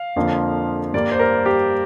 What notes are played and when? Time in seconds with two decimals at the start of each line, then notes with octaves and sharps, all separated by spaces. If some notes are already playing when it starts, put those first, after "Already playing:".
Already playing: F5
0.16 F2 D3 F3 A#3
0.94 G2 G3 A#3 D5
1.12 C5
1.19 A#4
1.46 G4